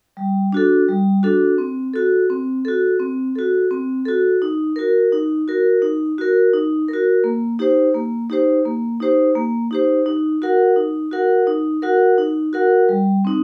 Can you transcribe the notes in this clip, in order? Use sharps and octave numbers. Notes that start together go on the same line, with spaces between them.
G3
D4 F#4 A4
G3
D4 F#4 A4
C4
F#4 A4
C4
F#4 A4
C4
F#4 A4
C4
F#4 A4
D#4
F#4 A#4
D#4
F#4 A#4
D#4
F#4 A#4
D#4
A#4
F#4
A#3
D#4 G4 C5
A#3
D#4 G4 C5
A#3
D#4 G4 C5
A#3
D#4 G4 C5
D#4
F#4 A#4 F#5
D#4
F#4 A#4 F#5
D#4
F#4 A#4 F#5
D#4
F#4 A#4 F#5
G3
C4 D#4